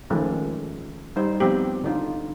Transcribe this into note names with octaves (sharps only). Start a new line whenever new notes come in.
D#3 F3 G#3 A3 C#4
G3 D#4 C5
F3 B3 C4 G4
D3 D#4 F4